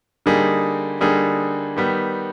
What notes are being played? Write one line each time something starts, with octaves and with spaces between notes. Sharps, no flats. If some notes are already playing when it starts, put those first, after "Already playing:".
D3 G3 A#3 D#4 G#4
D3 G3 A#3 D#4 G#4
D#3 G3 B3